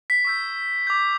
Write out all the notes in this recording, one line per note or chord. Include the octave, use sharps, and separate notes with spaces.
B6
C#6 E6 G6
D6 G6